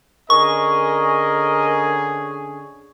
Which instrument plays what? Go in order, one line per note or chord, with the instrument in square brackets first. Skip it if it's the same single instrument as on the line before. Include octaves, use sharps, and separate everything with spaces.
[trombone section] D3 C#4 G#4 [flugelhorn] A#4 [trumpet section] D#5 [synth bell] C#6